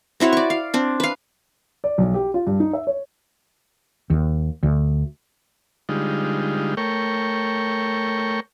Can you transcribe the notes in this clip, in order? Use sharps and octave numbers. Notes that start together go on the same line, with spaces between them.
C4 E4 F#4 C#5
D5 C#6
F5
C4 D4
B4 F5
D5
B1
G4
F4
G2
D#4
E5
C#5
D#2
D2
D3 G3 G#3 D#4 F4
A3 A#4 C#5 G5 C#6